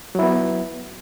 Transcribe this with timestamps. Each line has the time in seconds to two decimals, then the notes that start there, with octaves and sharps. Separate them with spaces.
0.15 F#3
0.19 E4
0.23 B3